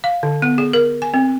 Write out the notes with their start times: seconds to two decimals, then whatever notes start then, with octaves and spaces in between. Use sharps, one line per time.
0.04 F5
0.23 D3
0.42 B3
0.58 G#4
0.73 A#4
1.02 G#5
1.14 C4